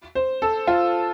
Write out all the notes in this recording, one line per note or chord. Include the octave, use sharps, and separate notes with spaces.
C5
A4
F4